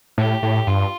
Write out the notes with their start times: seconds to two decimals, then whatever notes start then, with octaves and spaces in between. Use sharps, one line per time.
0.18 A2 G4
0.43 A2
0.67 G2 F4